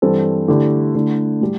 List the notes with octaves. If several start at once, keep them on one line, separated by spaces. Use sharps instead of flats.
G2 E3 C4 A4 C5
D3 A3 E4 G4
D3 A3 E4
A2 G3